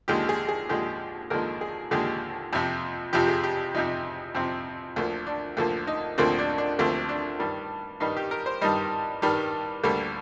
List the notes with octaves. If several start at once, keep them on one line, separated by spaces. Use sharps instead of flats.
D#2 D3 F3 G#3 G4
G#4
G#4
D#2 D3 F3 G#3 G4
D#2 D3 F3 G#3 A#4
G#4
D#2 D3 F3 G#3 G4
F2 C3 F3
F2 C3 F3 G4
G#4
G4
F2 C3 F3 D#4
F2 C3 F3 C4
D2 D3 F3 A#3
D4
D2 D3 F3 A#3
D#4
D2 D3 F3 A#3 C4
D4
D4
D2 D3 F3 A#3 C4
D4
G2 D#3 G3
G2 D#3 G3 D#4
G4
A#4
C5
G2 D#3 G3 D#5
G2 D#3 G3
D2 D3 G3 A#3